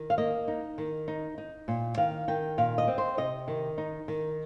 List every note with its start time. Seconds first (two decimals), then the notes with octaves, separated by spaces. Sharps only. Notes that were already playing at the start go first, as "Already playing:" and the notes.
Already playing: D#3
0.10 F5
0.18 A#3 D#5
0.48 D#4
0.78 D#3
1.08 D#4
1.38 D#4
1.68 A#2
1.97 D#3 F5
2.28 D#3 G5
2.58 A#2 F5
2.78 D#5
2.88 C4
2.98 C5
3.17 C3 D#5
3.48 D#3
3.78 D#4
4.08 D#3